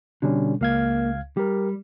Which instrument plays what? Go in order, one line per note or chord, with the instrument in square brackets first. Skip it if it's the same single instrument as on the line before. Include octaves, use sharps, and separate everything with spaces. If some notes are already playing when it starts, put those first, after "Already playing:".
[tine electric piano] B2 G3 C#4 [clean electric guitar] D3
[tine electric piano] C#2 F5 G#6 [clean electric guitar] A#3
[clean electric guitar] G3 [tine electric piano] G4 A#4